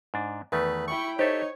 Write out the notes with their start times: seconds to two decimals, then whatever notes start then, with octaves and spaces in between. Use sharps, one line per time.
0.14 G#2 D4
0.52 E2 D#3 A3 B4
0.88 E4 G5 B5 C#6
1.19 D#4 G4 A4 C5 C#5 E5